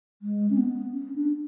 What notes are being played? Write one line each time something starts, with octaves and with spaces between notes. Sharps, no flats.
G#3
C#4
B3
C#4
D4